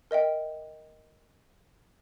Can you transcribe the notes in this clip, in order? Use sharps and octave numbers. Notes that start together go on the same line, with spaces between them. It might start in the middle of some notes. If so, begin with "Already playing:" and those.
A#4 D#5 E5 G5